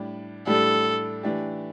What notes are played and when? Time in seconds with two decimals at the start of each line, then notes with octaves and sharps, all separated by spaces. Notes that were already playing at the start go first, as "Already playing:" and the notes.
Already playing: A2 G3 D4 G4
0.47 A2 G3 D4 G4 A4
1.23 E3 A3 D4 G4